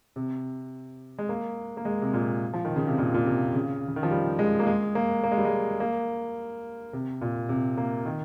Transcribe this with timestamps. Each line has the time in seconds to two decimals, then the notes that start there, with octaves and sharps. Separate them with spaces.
0.16 C3
1.18 G#3
1.29 A#3
1.77 A#3
1.85 G#3
2.02 C3
2.13 A#2
2.53 F3
2.65 D#3
2.76 C#3
2.87 C3
2.98 A#2
3.14 A#2
3.26 C3
3.54 C#3
3.88 C#3
3.96 D#3
4.03 F3
4.11 G3
4.39 G#3
4.59 A#3
4.67 G#3
4.95 A#3
5.24 A#3
5.31 G#3
5.38 G3
5.45 G#3
5.80 A#3
6.93 C3
7.21 A#2
7.49 C3
7.77 A#3
8.05 D#3